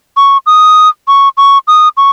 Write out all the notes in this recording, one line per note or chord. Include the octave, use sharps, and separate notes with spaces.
C#6
D#6
C#6
C#6
D#6
C#6